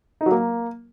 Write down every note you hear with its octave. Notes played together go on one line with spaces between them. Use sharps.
D#4
F#3
A#3